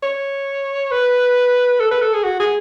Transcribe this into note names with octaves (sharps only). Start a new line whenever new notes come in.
C#5
B4
A4
B4
A4
G#4
F#4
G#4